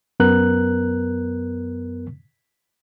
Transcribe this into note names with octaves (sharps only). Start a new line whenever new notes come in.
F#2 B3 A#4 F#6